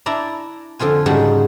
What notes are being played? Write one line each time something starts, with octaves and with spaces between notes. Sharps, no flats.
D4 E4 D5 A#5
F2 D3 F3 F4 G#5
G#2 C#3 G3 D4 D#4 F#4